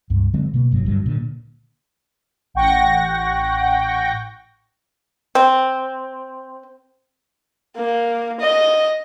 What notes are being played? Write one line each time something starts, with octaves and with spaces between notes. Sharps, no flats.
C#2 G2
D3 F#3 G#3 C4
B2 A#3
F#1 G2 F#3
D2 G2 F#3
A#2 D3
A1 F#5 G5 C#6 A#6
C4
A#3
D#5